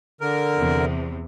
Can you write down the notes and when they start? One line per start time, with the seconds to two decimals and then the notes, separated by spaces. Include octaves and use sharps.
0.21 D3 A#4
0.57 E2 C3